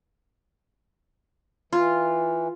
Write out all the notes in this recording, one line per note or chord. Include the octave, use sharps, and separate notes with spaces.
E3 F4